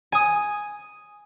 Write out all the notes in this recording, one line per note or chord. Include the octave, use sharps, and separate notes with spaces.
G#5 D#6